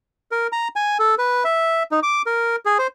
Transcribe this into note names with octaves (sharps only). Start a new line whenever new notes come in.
A#4
A#5
G#5
A4
B4
E5
D#4
D6
A#4
G#4
C5